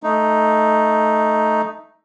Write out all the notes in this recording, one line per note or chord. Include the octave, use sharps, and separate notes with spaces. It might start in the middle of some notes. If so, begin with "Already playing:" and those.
A3 D#4